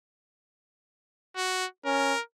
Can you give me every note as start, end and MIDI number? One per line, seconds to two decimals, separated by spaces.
1.36 1.66 66
1.85 2.13 61
1.85 2.21 70